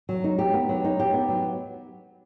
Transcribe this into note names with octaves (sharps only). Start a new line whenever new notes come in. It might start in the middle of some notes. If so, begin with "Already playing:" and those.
F#3
D#4
G4
B3
F#3
D#4
G4
B3
F#3